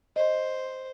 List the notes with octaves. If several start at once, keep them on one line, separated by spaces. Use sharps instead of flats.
C5 D#5